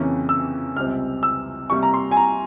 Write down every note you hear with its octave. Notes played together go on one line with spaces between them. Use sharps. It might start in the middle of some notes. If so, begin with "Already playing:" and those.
Already playing: F2 C#3 E3 A#3 C#4
E6
C#2 C3 G3 C4 F6
E6
C3 G3 A#3 C#6
A#5
C6
G#5
A#5